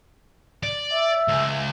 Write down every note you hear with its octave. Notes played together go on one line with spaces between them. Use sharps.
D5
E5
C#2